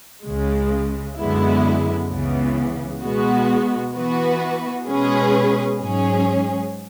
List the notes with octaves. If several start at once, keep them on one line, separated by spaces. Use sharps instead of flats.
C#2 C#3 G#3
F#2 D3 G#3 B3 E4
C#2 C#3 E3 B3
B2 G#3 B3 F#4
E3 B3 F#4 B4
B2 G#3 C#4 G#4 B4
G#2 F#3 C#4 G#4